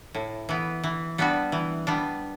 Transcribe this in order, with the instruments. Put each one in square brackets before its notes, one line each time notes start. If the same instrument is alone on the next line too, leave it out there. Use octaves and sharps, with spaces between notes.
[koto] A2
E3 B3
E3
G3 B3 D4 F#4
E3
G3 B3 D4